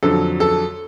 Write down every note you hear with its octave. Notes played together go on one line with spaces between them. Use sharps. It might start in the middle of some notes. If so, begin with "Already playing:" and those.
F2 D3 F#3 A4
A4